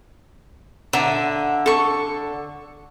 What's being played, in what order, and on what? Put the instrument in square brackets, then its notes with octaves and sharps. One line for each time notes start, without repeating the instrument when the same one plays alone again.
[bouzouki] D3 [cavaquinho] E5 A#5
[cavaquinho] A4 C#6